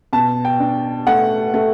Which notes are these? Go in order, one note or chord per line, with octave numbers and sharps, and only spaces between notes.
B2 A5
G5
D4
A3 F#5
A3